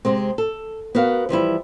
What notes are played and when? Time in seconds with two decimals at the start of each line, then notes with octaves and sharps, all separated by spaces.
0.05 C3 G#3 C4
0.38 A4
0.95 B3 F#4 A#4 F5
1.29 E3 F3 G3 E4